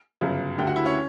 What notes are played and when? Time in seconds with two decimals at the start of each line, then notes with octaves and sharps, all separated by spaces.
0.21 G1 F#2 C#3
0.58 D2 D3 G4 G5
0.67 F#4 F#5
0.76 E4 E5
0.85 C#4 C#5